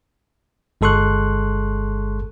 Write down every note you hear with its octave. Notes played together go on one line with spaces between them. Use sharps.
G1 G#3 A4 C6 C#6 F#6